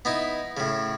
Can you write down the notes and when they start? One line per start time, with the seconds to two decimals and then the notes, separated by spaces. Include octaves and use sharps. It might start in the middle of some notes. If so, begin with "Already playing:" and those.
0.05 B3 D#4 E4
0.57 A2 C#3